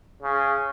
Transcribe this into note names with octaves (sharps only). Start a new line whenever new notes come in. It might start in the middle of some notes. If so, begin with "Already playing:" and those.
C#3